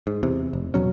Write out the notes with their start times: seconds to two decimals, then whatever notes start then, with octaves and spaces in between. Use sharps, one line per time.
0.07 G#2
0.23 E2 C3
0.53 F1
0.74 E2 B2 F#3 C#4